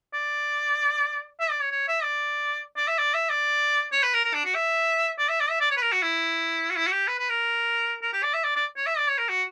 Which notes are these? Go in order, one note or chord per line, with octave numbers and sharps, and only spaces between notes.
D5
E5
D5
C#5
C#5
E5
D5
D5
E5
D5
E5
D5
C#5
B4
A#4
A#4
D4
F#4
E5
D5
E5
D5
E5
D5
C#5
B4
A#4
F#4
E4
F#4
E4
F#4
G4
B4
B4
A#4
A#4
G4
D5
E5
D5
D5
C#5
E5
D5
C#5
A#4
F#4